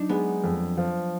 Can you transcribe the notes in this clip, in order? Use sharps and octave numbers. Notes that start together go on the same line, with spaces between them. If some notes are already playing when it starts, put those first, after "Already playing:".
Already playing: F#3 D4 D#4
G#3 B3
F2
F3